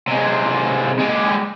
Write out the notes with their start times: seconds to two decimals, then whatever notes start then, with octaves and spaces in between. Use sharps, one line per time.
0.08 C3 G#3
0.99 G#3 G4